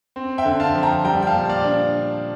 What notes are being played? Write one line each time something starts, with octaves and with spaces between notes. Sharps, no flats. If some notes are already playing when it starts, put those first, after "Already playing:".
C4
E5 G5
D3
F5 A5
F3
G5 A#5
G3 G5 A#5
G5
F5 A5
A#2
D5 F5
D4